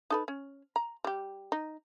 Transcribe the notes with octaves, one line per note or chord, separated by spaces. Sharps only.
D#4 A4 B4
C#4
A#5
G3 G4
D#4